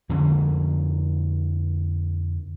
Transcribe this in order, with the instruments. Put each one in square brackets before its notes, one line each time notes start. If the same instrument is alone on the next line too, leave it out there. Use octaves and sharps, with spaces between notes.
[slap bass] F2 D3 A#3 C#4